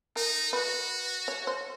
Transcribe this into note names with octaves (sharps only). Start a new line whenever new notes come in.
D#4 A#4
F#4 B4
C#5
C5